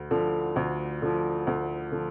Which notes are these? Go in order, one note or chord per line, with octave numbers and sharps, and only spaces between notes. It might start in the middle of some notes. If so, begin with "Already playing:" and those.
Already playing: D2
D3 F3
D2
D3 F3
D2
D3 F3